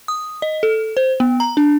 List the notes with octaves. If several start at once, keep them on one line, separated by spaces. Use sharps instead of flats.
D#6
D#5
A4
C5
B3
A#5
D4